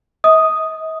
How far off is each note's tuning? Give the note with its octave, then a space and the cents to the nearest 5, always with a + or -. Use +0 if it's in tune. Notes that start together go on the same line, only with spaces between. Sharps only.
D#5 +45 D#6 +0